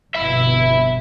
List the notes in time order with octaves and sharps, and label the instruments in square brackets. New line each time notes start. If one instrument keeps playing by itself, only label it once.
[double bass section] G1 F2 B2 [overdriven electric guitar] E5 B5